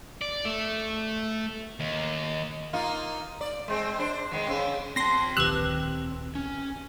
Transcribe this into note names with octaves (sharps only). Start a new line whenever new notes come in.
D5
A3
D#2
A#3 D#4 F4
D5
G#3 C4
D4 C5
D#3 G#3 B3
C#3 C4
C4 A5 C6 A#6
D1 A#1 D#3 G4 B4 E6 F#6
C#4